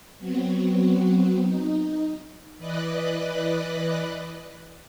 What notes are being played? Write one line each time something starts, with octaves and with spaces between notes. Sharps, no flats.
F#3 B3 C4 F#4
D#4
E3 B4 D5 D#5 F#6